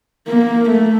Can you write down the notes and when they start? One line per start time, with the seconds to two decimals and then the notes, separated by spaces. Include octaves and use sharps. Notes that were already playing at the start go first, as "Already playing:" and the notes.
0.28 A#3
0.70 A3